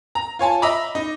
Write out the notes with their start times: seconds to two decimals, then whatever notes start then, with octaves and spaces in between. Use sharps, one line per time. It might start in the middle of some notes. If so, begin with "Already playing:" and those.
0.15 A#5
0.39 F4 C#5 G#5 A5
0.62 D#5 E5 A#5 B5 D6
0.95 D#4